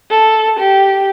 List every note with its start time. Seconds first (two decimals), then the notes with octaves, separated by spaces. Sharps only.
0.10 A4
0.59 G4